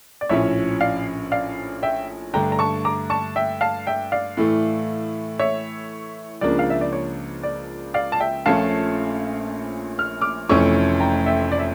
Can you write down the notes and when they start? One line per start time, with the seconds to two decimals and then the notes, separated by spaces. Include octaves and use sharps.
0.21 D5
0.29 A#1 A2 F3 C#4 C#5 E5
0.81 D5 F5
1.32 D5 F5
1.83 E5 G5
2.33 G2 D3 A3 D4 G5 A#5
2.52 A#5
2.59 A5 C#6
2.85 A#5 D6
3.10 A5 C#6
3.36 E5 G5
3.61 F5 A5
3.87 E5 G5
4.12 D5 F5
4.37 A2 E3 A3
5.39 C#5 E5
6.41 C#2 C#3 F3 A#3 D4 D5
6.59 F5
6.70 E5
6.81 D5
6.93 C#5
7.43 D5
7.94 D5 F5
8.12 A5
8.20 E5 G5
8.46 A#1 A#2 F3 A3 C#4 F5 A5
9.99 F6
10.21 D6 F6
10.49 F1 F2 E3 A3 C#4 C#6 E6
11.00 G5 A#5
11.26 E5 G5
11.52 D5
11.59 E5